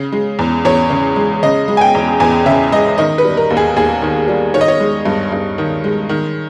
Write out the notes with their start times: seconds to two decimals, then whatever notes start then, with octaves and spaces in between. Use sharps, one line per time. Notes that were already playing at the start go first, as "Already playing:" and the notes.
Already playing: C#3
0.12 G#3
0.39 E2
0.65 E2 C#5
0.90 C#3
1.16 G#3
1.43 C#3 D#5
1.68 G#3
1.77 G#5
1.81 G5
1.95 E2
2.20 E2 G#5
2.46 C#3 E5
2.72 G#3 D#5
2.98 D#3 D#5
3.18 B4
3.24 G3
3.37 A#4
3.50 D#2
3.57 G#4
3.76 D#2 G#4
4.02 D#3
4.28 G3
4.54 D#3 C#5
4.61 D#5
4.68 C#5
4.80 G#3
5.06 G2
5.32 G2
5.58 D#3
5.84 G#3
6.09 D#3